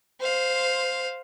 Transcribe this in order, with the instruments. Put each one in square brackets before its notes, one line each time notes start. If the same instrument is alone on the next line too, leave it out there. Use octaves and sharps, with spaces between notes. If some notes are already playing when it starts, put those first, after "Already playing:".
[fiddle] C5 F5